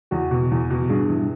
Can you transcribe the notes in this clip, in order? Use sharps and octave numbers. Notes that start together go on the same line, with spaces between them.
E2 F#4
B2
E2
B2
G2 G#4
E3